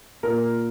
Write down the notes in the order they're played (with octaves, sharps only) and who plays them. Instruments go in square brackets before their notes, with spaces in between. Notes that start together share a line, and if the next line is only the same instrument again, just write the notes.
[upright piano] A#2 A#4